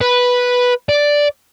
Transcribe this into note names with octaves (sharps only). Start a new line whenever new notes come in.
B4
D5